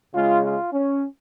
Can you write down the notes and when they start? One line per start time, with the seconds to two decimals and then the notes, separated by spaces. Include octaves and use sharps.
0.14 C#3 G#3 F4
0.44 F4
0.73 C#4